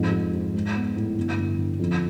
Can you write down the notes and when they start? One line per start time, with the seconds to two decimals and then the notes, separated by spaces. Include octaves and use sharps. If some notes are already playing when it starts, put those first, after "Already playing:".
Already playing: F2 G#2
0.13 G#2
0.33 G#2
0.54 G#3
0.75 B3
0.96 A2
1.17 G1
1.37 G1
1.59 D3
1.80 F2